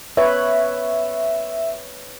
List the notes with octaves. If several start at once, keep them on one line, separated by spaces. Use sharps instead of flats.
B4 C#5 E5